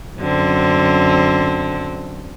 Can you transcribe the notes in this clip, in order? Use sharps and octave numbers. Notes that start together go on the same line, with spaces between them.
F#2 D3 C4